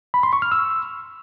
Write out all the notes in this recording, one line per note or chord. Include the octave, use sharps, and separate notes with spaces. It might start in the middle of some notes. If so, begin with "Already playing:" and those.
B5
C6
C#6
F6
E6